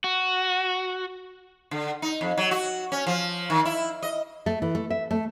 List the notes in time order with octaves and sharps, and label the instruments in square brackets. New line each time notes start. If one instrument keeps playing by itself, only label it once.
[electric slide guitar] F#4
[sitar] D3
D#4
F2
F#3
F#4
C#4
F3
D#3
E4
D#5
[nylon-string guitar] A3
E3
A3
E5
A3